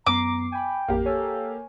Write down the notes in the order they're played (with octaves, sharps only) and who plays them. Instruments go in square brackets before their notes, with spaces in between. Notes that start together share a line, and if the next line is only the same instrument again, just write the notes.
[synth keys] F#2 B3 C7 [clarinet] A#5 [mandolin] D6
[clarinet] G5 [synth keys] G#5 B5
[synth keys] A1 F2 [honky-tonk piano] A#3 G4
[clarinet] A4 [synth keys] C#5 G#5